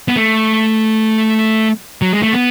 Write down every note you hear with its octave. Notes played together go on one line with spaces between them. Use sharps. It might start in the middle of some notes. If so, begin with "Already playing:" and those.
B3
A3
F#3
G#3
A3
B3